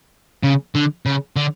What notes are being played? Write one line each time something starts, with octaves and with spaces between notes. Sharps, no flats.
C#3
D3
C#3
D3